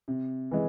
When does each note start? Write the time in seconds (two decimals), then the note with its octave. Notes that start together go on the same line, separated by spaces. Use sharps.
0.08 C3
0.51 E3 G#3